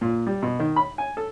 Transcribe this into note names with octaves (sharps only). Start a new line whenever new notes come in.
A#2
G3
B2
D#3
B5
G#5
A4